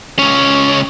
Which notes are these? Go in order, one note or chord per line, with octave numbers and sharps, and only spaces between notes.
C#2 C#4